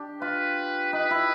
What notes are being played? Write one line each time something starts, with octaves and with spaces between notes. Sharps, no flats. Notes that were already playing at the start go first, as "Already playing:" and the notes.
Already playing: D4 G4
F4 B4
D#4 B4
E4